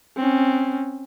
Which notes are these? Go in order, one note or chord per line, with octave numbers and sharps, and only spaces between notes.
C4 C#4